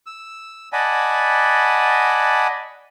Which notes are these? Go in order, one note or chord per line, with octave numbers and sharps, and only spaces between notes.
E6
D5 D#5 F#5 G#5 A5 B5